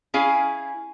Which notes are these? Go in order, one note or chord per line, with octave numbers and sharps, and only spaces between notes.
C#4 E4 G#4 F5 G#5